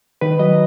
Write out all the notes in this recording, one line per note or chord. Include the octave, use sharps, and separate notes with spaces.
D#3 B4
F#3 D#5